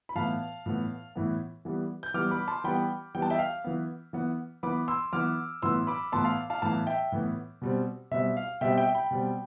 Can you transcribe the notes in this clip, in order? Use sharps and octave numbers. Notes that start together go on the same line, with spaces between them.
B5
A2 E3 B3 F5 A5
A2 E3 B3
A2 E3 B3
E3 G3 B3
G6
E3 G3 B3 D6 F6
B5 D6
A5 C6
E3 G3 B3 G5 B5
E3 G3 B3 G5
A5
E5 G5
F5
E3 B3
E3 B3
E3 B3 B5 D6
C6 E6
E3 B3 D6 F6
A2 E3 B3 C6 E6
B5 D6
A2 E3 B3 A5 C6
F5 A5
F5 A5
A2 E3 B3 F5 A5
E5 G5
A2 E3 B3
B2 G3 C4
B2 G3 C4 E5
F5
B2 G3 C4 E5 G5
E5 G5
G5 B5
B2 G3 C4